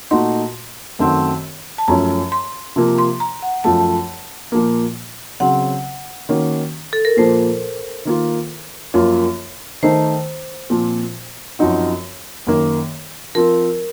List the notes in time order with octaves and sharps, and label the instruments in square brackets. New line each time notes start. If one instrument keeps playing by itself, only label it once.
[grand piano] A#2 A3 D#4 F#4 [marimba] C6
[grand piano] F#2 D#3 A3 C4 F#4
[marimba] A5
[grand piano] F#2 F3 A3 C#4 [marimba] A#5
[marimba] C6
[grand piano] C3 F3 A#3 F4
[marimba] C6
A#5
F#5
[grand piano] F#2 F3 A3 [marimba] A5
[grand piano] A#2 F3 A#3
[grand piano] C#3 F#3 C4 [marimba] F#5
[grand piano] D#3 A#3 C#4 F#4
[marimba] A4
A#4
[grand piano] A#2 F3 A#3 [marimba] C5
[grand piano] D#3 A#3 F4
F#2 F3 A#3 C#4 F4
[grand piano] D#3 A3 D#4 [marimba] C5
[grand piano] A#2 F3 C4
F#2 F3 C4 D#4 F#4
F#2 D#3 A#3
[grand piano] F3 C4 F4 [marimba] A#4